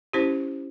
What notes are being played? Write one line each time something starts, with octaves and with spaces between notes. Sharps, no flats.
C#4 E4 G4 C5